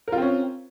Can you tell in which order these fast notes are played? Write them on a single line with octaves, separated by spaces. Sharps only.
A#4 F4 C4 C#4